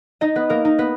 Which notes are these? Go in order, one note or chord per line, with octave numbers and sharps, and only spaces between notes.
D#4 D#5
B3 B4
A#3 A#4
D#4
B3 B4